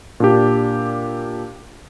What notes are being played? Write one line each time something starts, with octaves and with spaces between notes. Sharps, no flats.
A#2 D4 G4